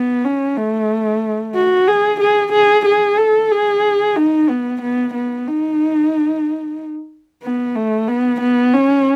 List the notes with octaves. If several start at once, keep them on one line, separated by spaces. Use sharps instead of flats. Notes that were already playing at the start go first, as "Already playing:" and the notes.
Already playing: B3
C#4
A3
F#4
G#4
G#4
G#4
G#4
A4
G#4
D#4
B3
B3
B3
D#4
B3
A3
B3
B3
C#4